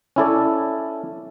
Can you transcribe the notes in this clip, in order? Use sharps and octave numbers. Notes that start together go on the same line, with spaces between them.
C#4 E4 A4 D5